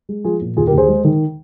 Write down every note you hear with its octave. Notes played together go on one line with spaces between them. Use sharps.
G#3
F3 F4 G#4
A#2
D#2 F4 G#4
G4 A#4
D#2
G#4 C5
G#3
D#3